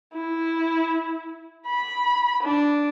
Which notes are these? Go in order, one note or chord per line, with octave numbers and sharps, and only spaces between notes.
E4
B5
D4